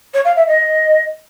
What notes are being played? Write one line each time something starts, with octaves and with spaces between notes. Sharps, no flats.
C#5
F5
E5
D#5